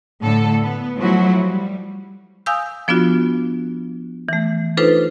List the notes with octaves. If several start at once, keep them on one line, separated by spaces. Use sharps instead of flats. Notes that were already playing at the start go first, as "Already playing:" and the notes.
A2 D3 A4
B3
F3 F#3 A3 E4 F#4
G3
F5 G#5 D#6 E6 G6
F3 B3 D4 F4 F#4
E3 A3
D4 D#4 F4 A4 B4 C5